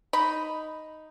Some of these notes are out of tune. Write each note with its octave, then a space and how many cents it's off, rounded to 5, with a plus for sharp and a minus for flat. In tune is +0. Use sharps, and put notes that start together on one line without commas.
D#4 +0 B5 +0